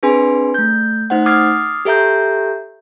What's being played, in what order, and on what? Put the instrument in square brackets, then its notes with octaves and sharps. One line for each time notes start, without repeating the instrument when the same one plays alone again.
[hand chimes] C4 D4 G#4 B4 G#5 C6
A3 G6
A3 D#4 C5 F#5
D6 D#6 F6 G#6 A6 C7
G4 A4 E5 A#5 G6